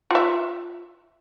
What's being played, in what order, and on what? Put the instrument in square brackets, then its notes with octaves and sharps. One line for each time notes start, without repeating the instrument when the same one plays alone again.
[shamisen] F4 E5